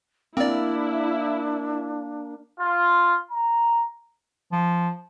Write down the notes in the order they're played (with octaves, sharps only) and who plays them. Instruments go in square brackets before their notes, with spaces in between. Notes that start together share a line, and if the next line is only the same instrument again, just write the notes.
[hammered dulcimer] A#3 [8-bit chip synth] C4 D5 [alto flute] D4 [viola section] E4
[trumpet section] F4
A#5
[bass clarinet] F3